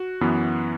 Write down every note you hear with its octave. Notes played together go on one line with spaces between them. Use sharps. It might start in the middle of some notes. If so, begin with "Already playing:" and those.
Already playing: F#4
F#2 E3 B3